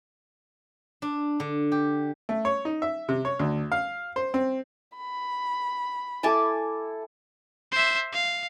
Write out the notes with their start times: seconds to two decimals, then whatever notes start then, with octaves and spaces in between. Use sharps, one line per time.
1.02 D4
1.40 D3
1.72 G4
2.29 A3
2.45 C#5
2.65 D#4
2.82 E5
3.09 C3
3.25 C#5
3.39 D2
3.72 F5
4.16 C5
4.34 C4
4.96 B5
6.23 E4 A4 G#5 A5 D6
7.72 C5 E5
8.12 F5